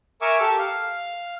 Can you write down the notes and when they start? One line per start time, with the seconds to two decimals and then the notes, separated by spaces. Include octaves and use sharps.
0.22 A#4 E5 G#5 C#6 D6
0.40 G4 A4
0.59 F5